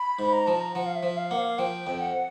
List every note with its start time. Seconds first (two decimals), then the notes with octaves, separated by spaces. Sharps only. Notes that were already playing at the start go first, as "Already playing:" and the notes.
Already playing: B5
0.19 G#2
0.33 A#5
0.47 F3 A5
0.60 A#5
0.75 F3 F#5
0.86 F5
0.96 E5
1.03 F3
1.17 F5
1.31 A#3 F#5
1.38 F5
1.59 F3 G5
1.87 F2
2.01 F#5